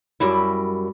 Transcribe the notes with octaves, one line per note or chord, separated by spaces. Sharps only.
F#2 G3 E4